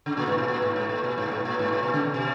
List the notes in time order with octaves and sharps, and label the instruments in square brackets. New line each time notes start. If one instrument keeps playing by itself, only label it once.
[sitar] C#3
A#2
G#2
B2
A#2
G#2
G#2
A#2
B2
G#2
A#2
G#2
A#2
G#2
A#2
B2
C#3
B2